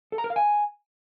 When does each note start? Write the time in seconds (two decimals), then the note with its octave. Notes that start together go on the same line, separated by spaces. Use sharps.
0.12 A4
0.18 A#5
0.24 A#4
0.30 F5
0.36 G#5